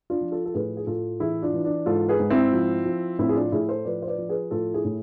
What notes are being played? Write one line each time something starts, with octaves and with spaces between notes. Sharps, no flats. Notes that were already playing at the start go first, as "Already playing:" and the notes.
D4 F4
F3
F4 A4
A4
A2 G#4 B4
G#4
A2 F4 A4
E3 E4 G#4
D4 F4
E3
D4
G#2 F4 A4
G#4 B4
G#2
C4 E4
F3
F3
A2 C4 E4
G#4
D4 F4
A2 E4 G#4
A4 C5
F3 B4 D5
C5
B4 D5
F3
G#4 B4
A2 F4 A4
E4 G#4
A2